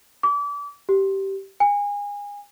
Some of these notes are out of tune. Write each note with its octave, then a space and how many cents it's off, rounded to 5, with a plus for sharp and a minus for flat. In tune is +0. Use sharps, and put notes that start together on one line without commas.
D6 -35
G4 -15
G#5 -30